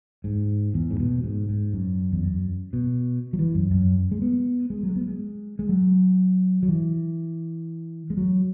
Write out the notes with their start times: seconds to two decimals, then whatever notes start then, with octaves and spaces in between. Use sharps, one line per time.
0.24 G#2
0.74 E2
0.90 G#2
1.00 B2
1.24 G#2
1.49 G#2
1.73 F#2
2.12 E2
2.23 F#2
2.73 B2
3.33 F#3
3.39 E3
3.55 F#2
3.71 F#2
4.11 G#3
4.22 B3
4.70 G#3
4.83 F#3
4.90 G#3
4.95 B3
5.08 G#3
5.59 G#3
5.69 F#3
6.63 F#3
6.69 E3
8.10 G#3
8.17 F#3